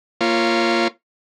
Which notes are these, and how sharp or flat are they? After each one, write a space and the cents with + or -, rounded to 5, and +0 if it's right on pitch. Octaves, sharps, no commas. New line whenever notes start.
A#3 +0 F4 -15 C#5 -15